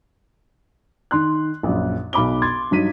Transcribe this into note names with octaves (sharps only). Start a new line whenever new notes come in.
D#3 C6 F#6
A#1 F#2
B1 D#4 B5 D6 G7
C6 G#6 A6
G2 F#3 D#4 B6 D#7